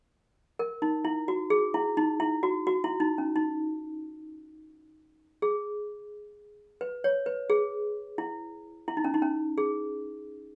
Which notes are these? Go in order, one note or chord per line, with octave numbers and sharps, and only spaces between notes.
A#4
D#4
E4
F#4
G#4
E4
D#4
E4
F#4
F#4
E4
D#4
C#4
D#4
G#4
B4
C#5
B4
G#4
E4
E4
D#4
C#4
D#4
C#4
G#4